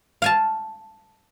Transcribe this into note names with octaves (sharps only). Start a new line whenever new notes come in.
F5 G#5 A5